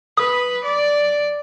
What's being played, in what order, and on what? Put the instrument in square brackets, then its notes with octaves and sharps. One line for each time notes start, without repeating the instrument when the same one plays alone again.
[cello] B4 [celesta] D#6
[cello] D5